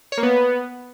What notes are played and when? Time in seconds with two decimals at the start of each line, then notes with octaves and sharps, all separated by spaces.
0.12 C#5
0.18 A#3
0.23 B3